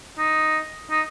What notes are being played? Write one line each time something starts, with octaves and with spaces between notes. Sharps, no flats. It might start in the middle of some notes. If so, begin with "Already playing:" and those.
D#4
D#4